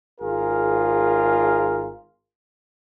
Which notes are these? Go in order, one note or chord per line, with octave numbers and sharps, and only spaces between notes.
G#1 F4 G#4 A#4